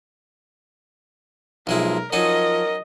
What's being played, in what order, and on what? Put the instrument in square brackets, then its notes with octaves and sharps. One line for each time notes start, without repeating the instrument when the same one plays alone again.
[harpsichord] B1 G#3 E4 [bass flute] F3 [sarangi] A#4
[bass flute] F3 [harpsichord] F#3 C#4 D#4 [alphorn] A#4 [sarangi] D#5